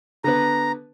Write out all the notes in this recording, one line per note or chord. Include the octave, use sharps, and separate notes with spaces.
D3 B3 B4 A#5